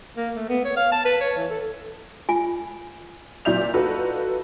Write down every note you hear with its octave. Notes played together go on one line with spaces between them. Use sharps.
A#3
A3
B3
C#5
F5
A5
B4
C#5
E3
A4
F4 G#5
A#2 F#3 D5 E5 G6 F7
D#4 F4 F#4 A4 B4